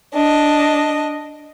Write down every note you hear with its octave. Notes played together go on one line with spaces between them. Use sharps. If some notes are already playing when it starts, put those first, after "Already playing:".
D4 D#5